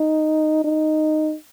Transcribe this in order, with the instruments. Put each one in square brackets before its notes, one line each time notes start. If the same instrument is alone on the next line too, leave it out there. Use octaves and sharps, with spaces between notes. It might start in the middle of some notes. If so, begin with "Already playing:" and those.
Already playing: [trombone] D#4
D#4